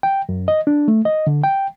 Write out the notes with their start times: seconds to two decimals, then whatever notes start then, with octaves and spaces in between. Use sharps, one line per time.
0.03 G5
0.29 F#2
0.48 D#5
0.67 D4
0.88 A3
1.05 D#5
1.27 D3
1.44 G5